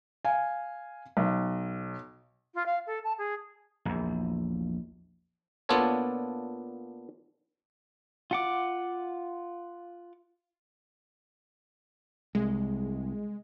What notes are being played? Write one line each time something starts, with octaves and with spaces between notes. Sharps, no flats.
F5 G#5
B1
F4
F5
A4
A5
G#4
A#1 E2
A#2 B3 D4 F4 A4 C#5
F4 F#5 D6
C2 G#3